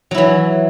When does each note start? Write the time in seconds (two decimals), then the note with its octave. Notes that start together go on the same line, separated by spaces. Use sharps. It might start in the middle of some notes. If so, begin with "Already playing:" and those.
0.11 F#3
0.14 E4
0.18 E3